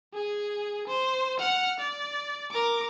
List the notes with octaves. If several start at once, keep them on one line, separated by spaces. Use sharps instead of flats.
G#4
C5
F#5 F6
D5
A#4 D6